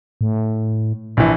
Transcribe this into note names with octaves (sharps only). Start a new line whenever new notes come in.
A2
A#1 E3